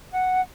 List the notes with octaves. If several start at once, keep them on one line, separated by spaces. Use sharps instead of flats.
F#5